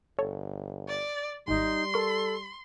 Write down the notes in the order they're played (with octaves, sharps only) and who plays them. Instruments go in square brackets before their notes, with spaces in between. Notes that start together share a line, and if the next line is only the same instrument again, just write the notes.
[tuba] G1 [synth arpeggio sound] A4 C#5
[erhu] D5
[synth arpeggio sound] G#1 G#2 [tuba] G3 [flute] D#4 [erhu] C6
[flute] A4 [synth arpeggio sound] A#4 C#6